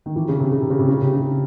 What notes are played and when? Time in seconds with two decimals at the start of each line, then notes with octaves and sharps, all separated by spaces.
0.06 D#3
0.16 E3
0.28 C#3
0.40 C3
0.52 C#3
0.62 C3
0.70 C#3
0.79 C3
0.89 C#3
1.01 C3
1.13 C#3